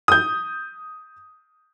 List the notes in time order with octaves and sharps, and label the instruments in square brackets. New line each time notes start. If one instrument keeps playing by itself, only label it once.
[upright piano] D#6 G6